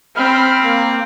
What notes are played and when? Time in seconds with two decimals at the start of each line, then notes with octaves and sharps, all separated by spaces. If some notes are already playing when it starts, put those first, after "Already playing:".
0.17 C4 B5 F6
0.63 A#3